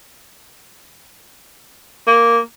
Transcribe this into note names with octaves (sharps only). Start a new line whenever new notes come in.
A#3